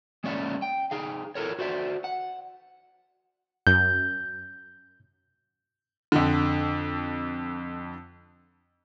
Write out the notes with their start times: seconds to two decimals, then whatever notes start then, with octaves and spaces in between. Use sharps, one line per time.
0.24 G#3 A#3 C#4 C#5 D5 E5
0.62 G5
0.91 D#4 G#4 F5
1.35 E4 A4 A#4 C#5
1.59 F#4 C5 D5 E5
2.04 F#5
3.67 F#2 G6
6.12 F2 D3